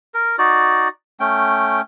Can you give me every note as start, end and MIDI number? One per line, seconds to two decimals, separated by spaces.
0.14 0.36 70
0.38 0.88 63
0.38 0.88 66
0.38 0.88 74
1.20 1.81 57
1.20 1.81 61
1.20 1.81 79